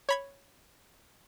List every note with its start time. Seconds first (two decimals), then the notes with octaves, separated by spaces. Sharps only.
0.09 C#5 B5 G#6